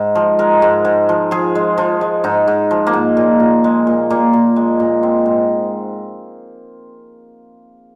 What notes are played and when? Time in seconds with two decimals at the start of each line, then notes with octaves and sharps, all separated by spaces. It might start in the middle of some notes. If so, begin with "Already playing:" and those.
Already playing: G#2 G#3
0.15 F3
0.39 G#3 A#4
0.62 G#2
0.85 G#2
1.09 F3
1.31 F3 G#4
1.55 G#3
1.78 F3
2.01 G#3
2.24 G#2 D#4
2.48 G#2
2.71 F3
2.87 A#3
2.93 G#2
3.17 A#2
3.40 A#2
3.64 G#3
3.87 A#2
4.10 A#2 A#3
4.33 A#2
4.56 G#3
4.80 A#2
5.03 G#3 C4
5.26 G#2